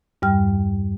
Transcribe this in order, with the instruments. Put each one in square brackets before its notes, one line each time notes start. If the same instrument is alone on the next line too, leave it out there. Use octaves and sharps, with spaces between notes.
[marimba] E2 G2 G3 G5 F6